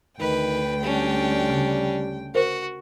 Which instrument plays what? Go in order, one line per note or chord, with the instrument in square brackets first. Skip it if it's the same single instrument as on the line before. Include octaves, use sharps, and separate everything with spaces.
[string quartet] D2 G5 [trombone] D#3 [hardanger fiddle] B4
[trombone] G3 [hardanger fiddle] C#4 D4
[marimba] C#3
[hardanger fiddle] F#4 [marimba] A#4 C5